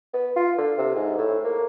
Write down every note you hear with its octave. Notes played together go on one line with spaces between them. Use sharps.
B3
F4
D3
C3
G#2
A2
A#3